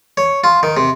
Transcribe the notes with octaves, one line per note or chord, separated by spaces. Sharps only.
C#5
F4
D#3
C3